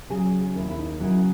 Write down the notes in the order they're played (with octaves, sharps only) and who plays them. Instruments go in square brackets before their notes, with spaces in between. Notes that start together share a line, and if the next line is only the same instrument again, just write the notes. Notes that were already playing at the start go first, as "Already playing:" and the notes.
[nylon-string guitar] C#3 F#3 G#4
D#2 E4
E4
D#4
C#3 F#3 E4